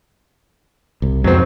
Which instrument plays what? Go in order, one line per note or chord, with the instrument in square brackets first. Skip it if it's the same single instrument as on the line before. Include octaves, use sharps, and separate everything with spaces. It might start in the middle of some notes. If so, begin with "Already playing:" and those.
[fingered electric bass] C2
[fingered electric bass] F2 G#2 [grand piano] F#3 C4